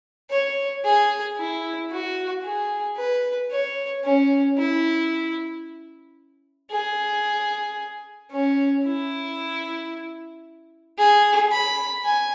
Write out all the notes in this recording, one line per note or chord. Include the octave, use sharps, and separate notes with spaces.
C#5
G#4
E4
F#4
G#4
B4
C#5
C#4
E4
G#4
C#4
E4
G#4
B5
G#5